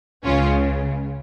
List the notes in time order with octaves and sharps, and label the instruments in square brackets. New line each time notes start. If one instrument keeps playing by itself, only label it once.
[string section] C#2 C#3 C#4 F4